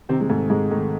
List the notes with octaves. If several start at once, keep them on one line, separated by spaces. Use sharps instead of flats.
C3 D#3 C4
G#3
G#2 A3
G#2 G#3
D#3 A3